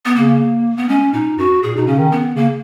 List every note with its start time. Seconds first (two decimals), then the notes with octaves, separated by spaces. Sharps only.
0.05 B3
0.15 C#3 A#3
0.77 B3
0.89 G#3 C#4
1.13 A#2 D#4
1.38 F#2 F#4
1.63 A#2 G#4
1.76 B2 D#4
1.87 C#3 C#4
1.99 D#3
2.12 B3
2.35 C#3 A#3